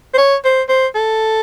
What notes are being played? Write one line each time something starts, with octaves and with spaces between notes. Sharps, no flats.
C5
C#5
C5
C5
A4